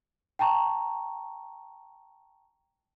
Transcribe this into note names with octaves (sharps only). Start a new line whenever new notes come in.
G5 A5 A#5 C#6